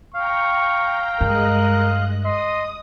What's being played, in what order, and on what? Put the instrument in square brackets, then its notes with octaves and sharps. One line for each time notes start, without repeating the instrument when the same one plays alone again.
[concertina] F5 [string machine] G5 A#5 [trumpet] C#6
[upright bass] G2 [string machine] G#3 D#5 F#6 [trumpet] A#4
[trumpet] D#5 [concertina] C6 [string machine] D#6